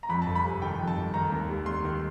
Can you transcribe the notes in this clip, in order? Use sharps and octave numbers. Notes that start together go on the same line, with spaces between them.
A#5
F2 B5
A5
G1
B5
C3 G#5
D#3 G5
F2
A5
G1
D#3 A#5
D#2
G3
D#2 C6
D#3